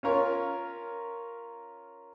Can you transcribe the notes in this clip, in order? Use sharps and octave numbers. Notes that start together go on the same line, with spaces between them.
C#4 F4 A#4 C#5